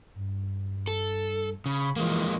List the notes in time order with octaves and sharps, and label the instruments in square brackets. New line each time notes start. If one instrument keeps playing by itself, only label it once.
[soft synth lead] G2
[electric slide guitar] A4
[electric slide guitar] C#3 [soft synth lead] B5
[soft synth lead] E3 [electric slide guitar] F3 G#3 A#3